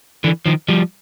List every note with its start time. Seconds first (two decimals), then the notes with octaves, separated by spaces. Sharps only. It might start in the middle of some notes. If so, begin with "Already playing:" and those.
0.24 D3 E3
0.46 D#3 F3
0.68 F3 G3